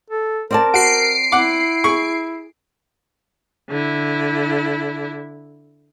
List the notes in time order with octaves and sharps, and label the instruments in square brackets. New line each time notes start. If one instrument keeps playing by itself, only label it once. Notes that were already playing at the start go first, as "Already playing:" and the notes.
[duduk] A4
[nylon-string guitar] C4 D5 A5 [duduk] A#4
[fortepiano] F#4 [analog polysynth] C7 D7
[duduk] E4 [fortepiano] F#5 D6
[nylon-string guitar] G#4 [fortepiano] C#6
[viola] D3 E4